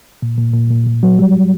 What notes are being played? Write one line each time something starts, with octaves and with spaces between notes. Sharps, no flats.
A#2
A#2
A#2
A#2
A#2
F#3
G3